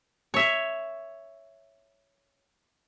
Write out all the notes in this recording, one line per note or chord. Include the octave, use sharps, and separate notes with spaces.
C#5 E5